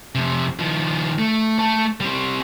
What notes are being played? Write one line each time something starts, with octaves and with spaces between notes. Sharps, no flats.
F2 C3
D#3 F3
A3
A3
G3 C4